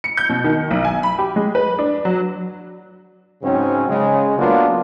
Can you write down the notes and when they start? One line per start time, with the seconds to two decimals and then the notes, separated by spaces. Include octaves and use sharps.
0.04 C#7
0.17 G6
0.30 B2
0.44 D#3
0.71 B1
0.85 G#5
1.03 B5
1.18 G4
1.36 G#3
1.55 B4
1.79 D4
2.05 F#3
3.42 G#2 C#3 F#3 C4 C#4
3.89 C#3 G#3
4.38 F#3 A#3 B3 D4 F4 F#4